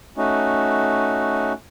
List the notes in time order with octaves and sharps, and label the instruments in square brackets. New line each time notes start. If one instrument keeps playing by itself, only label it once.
[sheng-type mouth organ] A3 C#4 D#4 F#4